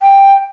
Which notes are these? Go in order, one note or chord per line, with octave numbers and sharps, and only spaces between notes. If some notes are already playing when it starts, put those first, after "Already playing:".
G5